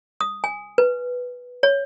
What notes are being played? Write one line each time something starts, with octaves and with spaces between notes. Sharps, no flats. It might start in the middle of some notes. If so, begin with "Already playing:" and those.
D#6
G#5
B4
C#5